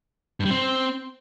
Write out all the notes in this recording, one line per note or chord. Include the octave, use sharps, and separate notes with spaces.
G2
G3
C4